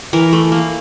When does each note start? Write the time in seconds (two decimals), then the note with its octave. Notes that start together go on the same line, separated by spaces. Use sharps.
0.13 E3 A#4
0.33 A3
0.52 A#3